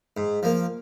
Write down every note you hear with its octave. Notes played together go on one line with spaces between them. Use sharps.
G#2
F3 A#3